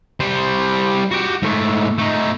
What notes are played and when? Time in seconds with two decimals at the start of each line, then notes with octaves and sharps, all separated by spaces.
0.20 G3 C5
1.11 F#4 G4
1.42 G#2 A3
1.98 A3 D#4